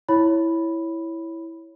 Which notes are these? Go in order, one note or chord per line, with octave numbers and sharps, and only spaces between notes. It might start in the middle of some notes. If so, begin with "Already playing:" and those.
E4 C#5 B5